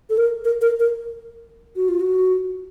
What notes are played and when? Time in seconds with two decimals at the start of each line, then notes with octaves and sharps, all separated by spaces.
0.10 A4
0.17 A#4
0.44 A#4
0.61 A#4
0.80 A#4
1.76 F#4
1.89 F4
2.00 F#4